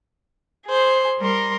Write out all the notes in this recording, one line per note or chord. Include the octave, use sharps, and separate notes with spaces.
G#4 C5
G3 A#4 C6